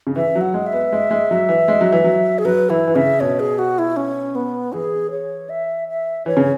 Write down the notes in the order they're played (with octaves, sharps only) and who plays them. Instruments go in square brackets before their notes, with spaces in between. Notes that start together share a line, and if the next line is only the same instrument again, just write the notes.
[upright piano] C#3
[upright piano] E3 [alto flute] E5
[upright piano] F#3
[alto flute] F#5
[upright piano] G#3
[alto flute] E5
[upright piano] B3
G#3
G#3
F#3
E3
G#3
F#3
E3
F#3
[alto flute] G#4
[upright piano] F#3 [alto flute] B4
[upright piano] E3 [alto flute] E4
[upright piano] E3
[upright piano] C#3 [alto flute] E5
[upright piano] B2 [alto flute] C#5
[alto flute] G#4
F#4
E4
C#4
B3
[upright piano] E3 [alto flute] G#4
[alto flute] C#5
E5
E5
[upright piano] E3 [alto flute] C#5
[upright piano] C#3